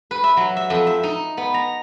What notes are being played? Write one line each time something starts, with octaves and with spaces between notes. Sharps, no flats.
B4
E5
F#3
E5
F2
E5
D#4
B3
A#5